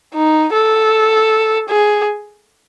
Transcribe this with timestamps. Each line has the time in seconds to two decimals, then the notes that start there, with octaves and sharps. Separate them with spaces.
0.14 D#4
0.53 A4
1.69 G#4